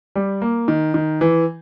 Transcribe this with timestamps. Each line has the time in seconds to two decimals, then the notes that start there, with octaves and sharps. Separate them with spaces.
0.16 G3
0.42 A#3
0.68 D#3
0.94 D#3
1.21 E3